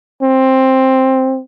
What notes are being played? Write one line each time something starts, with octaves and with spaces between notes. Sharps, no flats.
C4